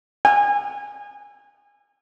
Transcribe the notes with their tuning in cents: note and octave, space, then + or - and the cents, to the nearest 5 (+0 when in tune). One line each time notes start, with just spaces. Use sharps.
G#5 -25